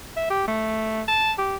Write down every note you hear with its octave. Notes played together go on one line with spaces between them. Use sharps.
E5
G4
A3
A5
G4